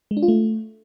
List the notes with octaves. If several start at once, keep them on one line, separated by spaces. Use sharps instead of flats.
G#3
D4
F4
A3